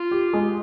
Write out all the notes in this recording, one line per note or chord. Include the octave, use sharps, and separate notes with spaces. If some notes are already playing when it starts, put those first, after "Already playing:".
Already playing: F4
G4
G#3